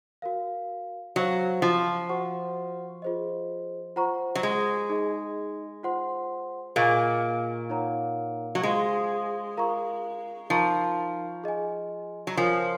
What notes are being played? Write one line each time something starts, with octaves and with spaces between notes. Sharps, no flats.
F#4 A#4 F5
F#3 F#4 C5 F5
F3
F#4 C5 F#5 C#6
F4 G#4 C5 D#5
F4 C5 F#5 A#5 C#6
F#3
G#3
D#4 G#4 D#5
F4 C5 F#5 C6
A#2 A#3 G#4 D#5 G#5 C#6
D#4 A#4 C#5 F#5 A#5
F#3
G#3 F4 C5 F5 C6
F4 A#4 F5 A#5 C#6
F3 D#4 A#4 F5 A#5 C#6
G#4 D#5 G#5
F#3
F3 F4 A#4 C#5 G#5 C6